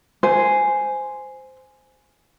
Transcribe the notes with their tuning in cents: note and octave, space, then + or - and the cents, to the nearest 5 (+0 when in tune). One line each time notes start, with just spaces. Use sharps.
C5 -10 G#5 +0